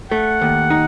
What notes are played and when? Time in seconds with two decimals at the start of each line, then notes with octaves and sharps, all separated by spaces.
0.11 A3 F#5
0.41 D#2
0.70 D#4